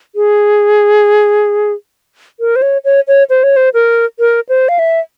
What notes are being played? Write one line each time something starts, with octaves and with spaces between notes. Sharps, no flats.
G#4
A#4
C5
C#5
C#5
C#5
C5
C#5
C5
A#4
A#4
C5
F5
E5